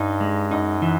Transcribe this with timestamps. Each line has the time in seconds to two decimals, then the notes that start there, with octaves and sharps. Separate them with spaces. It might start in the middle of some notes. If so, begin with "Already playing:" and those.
Already playing: G2 D#4
0.21 G#3
0.51 F#2 D#4
0.82 E3